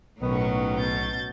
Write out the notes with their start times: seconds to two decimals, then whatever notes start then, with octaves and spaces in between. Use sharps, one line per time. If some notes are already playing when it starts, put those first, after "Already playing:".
0.21 B1 A2 D#3 F#3 B3 C#4 C#6
0.78 B2 G6 A6